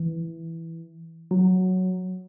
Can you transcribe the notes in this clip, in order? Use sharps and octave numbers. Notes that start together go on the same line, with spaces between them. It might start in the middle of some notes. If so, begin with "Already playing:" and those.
Already playing: E3
F#3